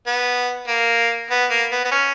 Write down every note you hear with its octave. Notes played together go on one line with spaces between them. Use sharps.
B3
A#3
B3
A#3
B3
B3
C#4